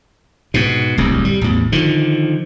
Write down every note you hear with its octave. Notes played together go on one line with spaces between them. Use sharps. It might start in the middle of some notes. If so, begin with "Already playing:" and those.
G#2 B2
D1 C2 F#2
G3
A1 E2
D3 D#3 F3